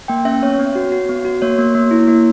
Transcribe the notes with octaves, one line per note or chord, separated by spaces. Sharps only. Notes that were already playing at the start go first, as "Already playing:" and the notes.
A#3 G5
C#4 E5
B3 C#5
B3
F#4
F#4
B3
F#4
A#3 C#5
A#3
A#3
E4
A#3